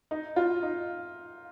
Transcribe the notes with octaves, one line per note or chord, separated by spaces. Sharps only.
D#4
F4
D#4